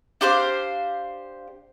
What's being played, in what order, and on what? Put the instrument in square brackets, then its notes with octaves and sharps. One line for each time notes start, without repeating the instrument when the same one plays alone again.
[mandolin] D4 G4 C5 F5